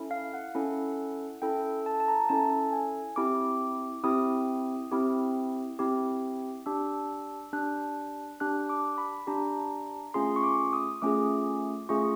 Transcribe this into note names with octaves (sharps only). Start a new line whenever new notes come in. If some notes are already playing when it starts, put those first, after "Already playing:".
Already playing: C#4 E4 A4
F5
F#5
C#4 E4 A4
C#4 E4 A4 G5
A5
A5
A#5
C#4 E4 A4 A5
G#5
C4 E4 G4 D6
C4 E4 G4 D#6
C4 E4 G4
C4 E4 G4
D4 G4 E6
D4 G4 F#6
D4 G4 F#6
D6
B5
D4 G4 A#5
A3 C#4 F4 G#4 C6
C#6
D6
D#6
A3 C#4 F4 G#4 D6
A3 C#4 F4 G#4 C#6